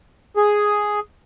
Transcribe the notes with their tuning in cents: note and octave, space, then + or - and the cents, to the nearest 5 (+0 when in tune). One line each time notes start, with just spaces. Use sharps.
G#4 +0